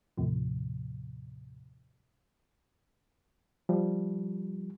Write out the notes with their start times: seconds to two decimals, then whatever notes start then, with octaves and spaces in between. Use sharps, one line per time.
0.17 D#2 A2 C3 F3
3.69 F3 G3